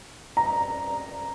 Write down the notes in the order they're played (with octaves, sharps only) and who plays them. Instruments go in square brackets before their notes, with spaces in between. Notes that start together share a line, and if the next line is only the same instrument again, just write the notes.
[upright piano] A#5